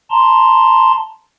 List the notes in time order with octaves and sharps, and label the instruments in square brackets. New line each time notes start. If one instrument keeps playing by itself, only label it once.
[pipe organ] A5 A#5 C6